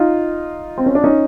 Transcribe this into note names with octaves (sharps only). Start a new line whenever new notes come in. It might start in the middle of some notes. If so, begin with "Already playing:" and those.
Already playing: D#4 F4
C4
C#4
D4
C#4 D#4